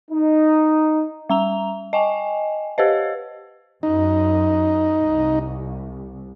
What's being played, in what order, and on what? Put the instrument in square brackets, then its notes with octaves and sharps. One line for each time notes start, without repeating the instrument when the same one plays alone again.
[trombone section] D#4
[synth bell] G3 A#5 F7
D#5 G5 G#5
G4 B4 C5 D#5
[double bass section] F#2 [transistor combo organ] D#4
[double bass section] C2